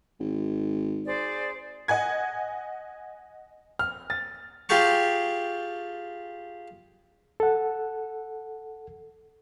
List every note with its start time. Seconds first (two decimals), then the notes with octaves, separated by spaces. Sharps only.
0.20 G#1
1.06 G#4 C5 D5
1.88 D#5 F#5 G#5 G#6
3.79 F6
4.10 A6
4.69 F4 G4 G#4 G5 A5 C#6
7.40 A4 F#5